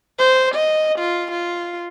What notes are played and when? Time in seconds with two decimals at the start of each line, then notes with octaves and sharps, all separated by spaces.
0.19 C5
0.54 D#5
0.98 F4
1.31 F4